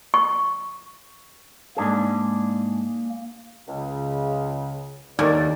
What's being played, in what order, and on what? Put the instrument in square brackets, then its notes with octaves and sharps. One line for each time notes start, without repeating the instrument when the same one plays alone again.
[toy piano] C#6
[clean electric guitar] G#2 D4 G#4 [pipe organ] A#3
[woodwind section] C#2 C#3
[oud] D#2 [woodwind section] A2 D5